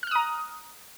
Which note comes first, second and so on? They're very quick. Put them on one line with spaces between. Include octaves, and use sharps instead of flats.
F6 F#6 D#6 A#5